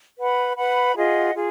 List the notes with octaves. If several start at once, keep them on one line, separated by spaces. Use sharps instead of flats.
B4 F#5 B5
B4 F#5 B5
F4 G#4 D#5 F#5
F4 G#4